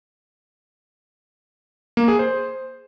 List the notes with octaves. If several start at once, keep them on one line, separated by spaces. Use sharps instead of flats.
A#3
G#4
C5